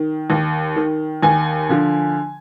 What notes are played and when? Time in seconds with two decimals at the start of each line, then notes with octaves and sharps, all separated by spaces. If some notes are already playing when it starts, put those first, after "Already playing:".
Already playing: D#3
0.30 D#2
0.76 D#3
1.23 D#2 G#5
1.69 D3 F3